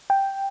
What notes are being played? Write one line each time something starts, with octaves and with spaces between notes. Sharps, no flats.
G5